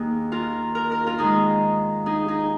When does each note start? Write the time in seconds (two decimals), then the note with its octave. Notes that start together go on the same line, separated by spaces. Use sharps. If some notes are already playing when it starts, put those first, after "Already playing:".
Already playing: D#2 D#3 A#3 D#4 G#4
0.32 F4 A#4
0.75 A#4
0.91 A#4
1.07 F4 A#4
1.18 G#2 D#3 G#3 D#4 G#4
2.06 D#4 G#4
2.28 D#4 G#4